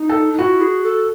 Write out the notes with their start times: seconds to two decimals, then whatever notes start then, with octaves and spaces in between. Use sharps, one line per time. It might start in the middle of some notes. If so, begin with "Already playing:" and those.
Already playing: D#4
0.09 A4
0.33 D#4
0.39 E4 F#4
0.61 G#4
0.84 A4